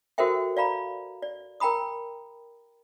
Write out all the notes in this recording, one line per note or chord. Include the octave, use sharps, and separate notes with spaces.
F#4 A4 A#4 C5 E5 G5
D5 F5 A#5 B5
D5
A#4 G5 A#5 B5 D#6